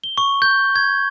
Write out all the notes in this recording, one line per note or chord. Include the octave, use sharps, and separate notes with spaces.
G7
C#6
G6
G#6